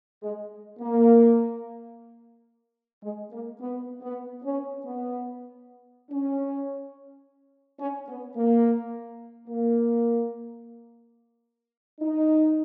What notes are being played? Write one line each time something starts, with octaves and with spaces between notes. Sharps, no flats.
G#3
A#3
G#3
A#3
B3
B3
C#4
B3
C#4
C#4
B3
A#3
A#3
D#4